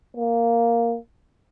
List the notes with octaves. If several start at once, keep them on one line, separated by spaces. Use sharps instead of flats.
A#3